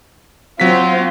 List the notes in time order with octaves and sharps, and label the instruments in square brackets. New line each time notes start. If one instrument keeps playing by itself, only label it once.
[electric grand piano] F#3 B6 [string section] C4 F4